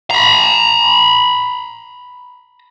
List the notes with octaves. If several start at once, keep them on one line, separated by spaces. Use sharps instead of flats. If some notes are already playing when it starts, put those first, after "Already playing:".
A#5 B5